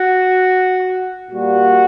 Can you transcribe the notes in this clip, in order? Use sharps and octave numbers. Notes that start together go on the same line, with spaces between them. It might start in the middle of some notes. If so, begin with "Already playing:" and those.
Already playing: F#4
A#2 G3 A#3 F#4